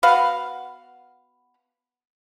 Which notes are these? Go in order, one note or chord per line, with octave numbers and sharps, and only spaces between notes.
B3 F#4 B4 F5